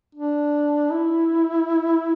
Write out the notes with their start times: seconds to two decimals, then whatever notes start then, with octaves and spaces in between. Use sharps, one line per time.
0.15 D4
0.91 E4